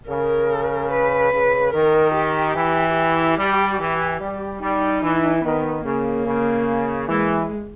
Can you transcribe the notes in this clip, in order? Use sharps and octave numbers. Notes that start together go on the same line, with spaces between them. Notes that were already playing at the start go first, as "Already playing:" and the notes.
C#3 A#4
B4
C#3
D#3 A#4
G4
E3
G4
G3
E3
G3
G3 D#4
E3
D#3 B3
C#3 A#3
C#3
E3 G#3